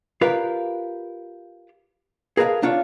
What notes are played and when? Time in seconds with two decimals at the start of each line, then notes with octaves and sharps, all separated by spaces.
0.21 F4 G4 A#4 B4 D5 F5
2.37 G#4 A#4 B4 D#5 F5 A5
2.62 A#3 D4 F4 C#5